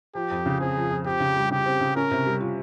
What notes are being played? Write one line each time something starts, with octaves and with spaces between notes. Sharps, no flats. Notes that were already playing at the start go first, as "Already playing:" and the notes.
F3 G4
F2
C#3
C4 G#4
F3
F2
C4 G4
C#3
G3
C#3 G4
C4
C#3
C#4 A#4
C3
G3
F4